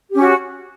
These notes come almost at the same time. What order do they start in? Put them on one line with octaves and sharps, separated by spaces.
G4 C#4 F#4